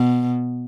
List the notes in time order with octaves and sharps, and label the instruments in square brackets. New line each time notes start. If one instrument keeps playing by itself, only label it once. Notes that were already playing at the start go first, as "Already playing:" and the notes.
Already playing: [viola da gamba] B2